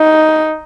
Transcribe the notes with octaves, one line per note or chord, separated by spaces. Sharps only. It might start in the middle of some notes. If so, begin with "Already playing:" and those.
Already playing: D#4